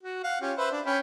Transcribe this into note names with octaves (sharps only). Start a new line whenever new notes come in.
F#4
F5 F#5
C#4 F4 G4
B4 C5 E5
D4
C#4 G5 B5